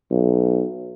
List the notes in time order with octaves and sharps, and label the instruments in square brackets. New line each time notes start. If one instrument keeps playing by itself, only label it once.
[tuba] B1